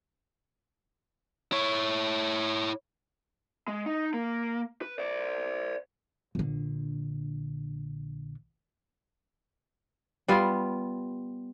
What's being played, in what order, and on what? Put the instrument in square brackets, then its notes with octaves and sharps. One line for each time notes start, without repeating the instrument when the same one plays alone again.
[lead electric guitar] E4 C#5
G#3
D#4
A#3
B4
C5 D5
[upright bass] A#1 D3
[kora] G3 B3 F4